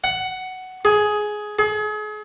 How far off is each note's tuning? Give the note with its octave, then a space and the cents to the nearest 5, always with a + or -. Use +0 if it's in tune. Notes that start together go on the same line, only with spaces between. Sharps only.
F#5 +10
G#4 +10
G#4 +35